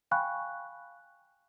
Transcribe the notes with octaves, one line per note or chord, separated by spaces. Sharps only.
F5 G5 G#5 B5 C#6 F#6